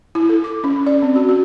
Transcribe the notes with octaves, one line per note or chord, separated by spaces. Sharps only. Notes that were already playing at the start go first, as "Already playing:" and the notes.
E4
A4
D6
C#4
D5
C4
F#4
F#4